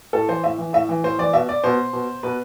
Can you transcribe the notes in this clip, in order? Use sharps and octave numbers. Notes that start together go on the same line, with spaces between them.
A2 A4
E3 C5
A2 E5
E3
A2 E5
E3
A2 C5
E3 D5
B2 E5
D5
B2 C5
B2
B2 B4